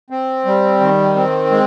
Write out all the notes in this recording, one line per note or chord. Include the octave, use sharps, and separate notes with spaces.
C4
G3
D#3
C4
G#3